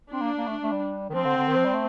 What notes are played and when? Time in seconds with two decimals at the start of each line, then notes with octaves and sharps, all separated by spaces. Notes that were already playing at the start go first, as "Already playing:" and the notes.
0.12 C4 D4
0.21 A#3
0.38 A#3
0.47 A3
0.63 A3
0.72 G3
1.10 D#3
1.14 F3 C4
1.25 D3
1.37 D3
1.48 D#3
1.56 F3
1.65 G3
1.73 A3